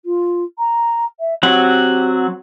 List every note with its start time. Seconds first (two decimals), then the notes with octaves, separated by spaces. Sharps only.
0.05 F4
0.58 A#5
1.20 E5
1.43 F#3 C4 G4 F#5